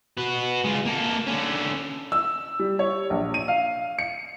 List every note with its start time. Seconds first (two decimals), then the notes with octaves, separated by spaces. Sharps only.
0.17 F#4 B4
0.64 G#3 F4
0.86 A#3 A4
1.27 D3 C#4
2.12 E6
2.59 G3
2.79 C#5
3.10 A#1
3.34 D#7
3.48 F5
3.99 C#7